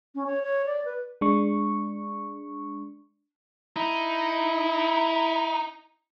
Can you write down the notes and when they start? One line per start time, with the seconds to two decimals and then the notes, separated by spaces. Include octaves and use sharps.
0.15 C#4
0.27 C#5
0.42 C#5
0.66 D5
0.85 B4
1.21 G#3 D4 C#6
3.76 D#4 E4